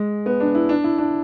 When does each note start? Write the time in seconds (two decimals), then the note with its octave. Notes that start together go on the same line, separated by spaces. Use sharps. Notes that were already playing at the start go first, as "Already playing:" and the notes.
Already playing: G#3
0.26 B3
0.40 D4
0.55 E4
0.69 D4
0.84 E4
0.98 D4